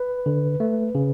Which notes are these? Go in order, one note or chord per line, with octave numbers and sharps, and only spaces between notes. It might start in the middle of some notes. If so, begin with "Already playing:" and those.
Already playing: B4
D3
A3
C#3